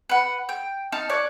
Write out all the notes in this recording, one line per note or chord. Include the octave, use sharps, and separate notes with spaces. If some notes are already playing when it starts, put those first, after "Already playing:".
B4 F#5
G5
D#4 A5 F6
C#5 D5 F#6